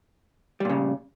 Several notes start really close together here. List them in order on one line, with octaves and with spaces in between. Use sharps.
G3 A#2 C#3